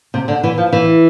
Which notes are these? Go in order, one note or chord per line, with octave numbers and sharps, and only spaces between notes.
C3
D3
E3
F3
E3